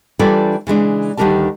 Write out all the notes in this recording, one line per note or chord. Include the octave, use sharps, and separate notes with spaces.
E3 G3 D4 F4 A4 C#5
C#3 E3 G#3 D4
D2 D#3 G3 D4 A#4 A5